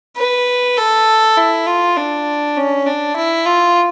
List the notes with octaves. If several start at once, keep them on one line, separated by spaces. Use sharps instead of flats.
B4
A4
E4
F4
D4
C#4
D4
E4
F4